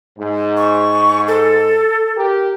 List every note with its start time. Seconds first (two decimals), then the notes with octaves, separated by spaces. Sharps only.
0.19 G#2
0.57 C#6
1.28 A4
2.17 G4 A#4